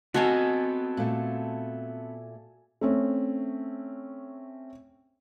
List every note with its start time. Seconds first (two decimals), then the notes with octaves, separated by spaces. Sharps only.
0.14 B3 C4 F#4 A4 D#5 F5 G#5 A5
0.97 A#2 A3
2.81 A3 C4 C#4